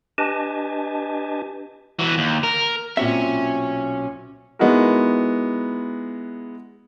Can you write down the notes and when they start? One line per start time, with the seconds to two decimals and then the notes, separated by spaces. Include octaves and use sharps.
0.18 D4 G4 B4 D#5 G#5 A5
1.99 E3 F#4
2.18 D#2
2.43 A#4
2.97 B1 A#2 C4 C#4 F#4 E5
4.59 G#3 B3 D#4 E4 F#4 A#4